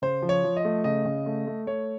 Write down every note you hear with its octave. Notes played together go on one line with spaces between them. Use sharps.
C#3 C5
F3
C#5
F3
D#5
A3
C#3 D#5
C#3
A3
A3
A3 C#5